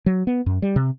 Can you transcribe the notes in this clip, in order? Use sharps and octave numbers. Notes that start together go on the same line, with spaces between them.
F#3
B3
F#2
G3
C3